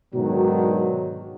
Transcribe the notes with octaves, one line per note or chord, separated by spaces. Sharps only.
G#2 B2 D3 D#3 F#3